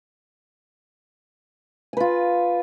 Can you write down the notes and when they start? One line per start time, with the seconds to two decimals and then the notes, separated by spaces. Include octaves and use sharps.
1.93 G#5
1.97 B4
2.00 F4